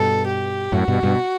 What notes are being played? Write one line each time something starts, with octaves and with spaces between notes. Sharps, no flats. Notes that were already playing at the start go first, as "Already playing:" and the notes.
Already playing: G2 B2 A4
G4
F#2 A2 F#4
G2 B2
G2 B2